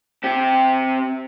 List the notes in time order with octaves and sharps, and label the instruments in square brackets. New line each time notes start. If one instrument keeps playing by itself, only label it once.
[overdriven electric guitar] C4 G4